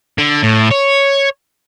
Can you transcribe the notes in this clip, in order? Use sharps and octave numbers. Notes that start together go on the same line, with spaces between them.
D3
A2
C#5